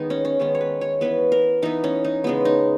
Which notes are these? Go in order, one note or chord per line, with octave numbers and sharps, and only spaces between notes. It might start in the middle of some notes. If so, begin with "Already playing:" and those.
Already playing: D#3 G#3 B3 D#4
C#4
C#4
D#3 G#3 B3 C#4
C#5
B4
C#5
E3 B3 B4
A#4
E3 B3 D#4
C#4
D#4
C#3 G#3 B3
D#4